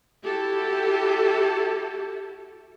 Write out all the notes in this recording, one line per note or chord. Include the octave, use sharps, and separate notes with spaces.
E4 F#4 G4 A4